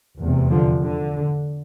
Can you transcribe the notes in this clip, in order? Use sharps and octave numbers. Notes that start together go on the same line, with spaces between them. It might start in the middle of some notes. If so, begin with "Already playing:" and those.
F1 E2 C3
D3 F3
D3